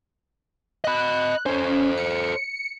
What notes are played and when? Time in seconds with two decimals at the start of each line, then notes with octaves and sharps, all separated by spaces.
0.84 D#5 B5 F#6
1.46 C#4 A4 C5
1.98 C#7